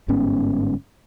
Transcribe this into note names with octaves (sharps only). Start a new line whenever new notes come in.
G1 G#2 B3 C#4